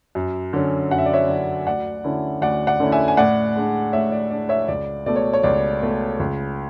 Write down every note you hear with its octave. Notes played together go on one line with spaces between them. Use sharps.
F#2
D3 F#3 C#4
F#2 F#5
E5
D5
C#5 E5
D3 F#3 C#4
D2 D5 F#5
D3 A3 C#4 E4
D2 D5 F#5
D5 F#5
D3 A3 C#4 E4
E5 G#5
G#5
A2 D5 F#5
G#3 D4
A2 C#5 E5
D5
G#3 D4 D5
C#5 E5
C#2 D5
B2 A3 D5
C#5
C#5
C#2 D5
B2 A3
C#2